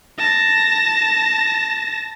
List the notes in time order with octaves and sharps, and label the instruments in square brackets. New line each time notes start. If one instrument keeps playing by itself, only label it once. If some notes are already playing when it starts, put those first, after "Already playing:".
[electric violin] A5 A#6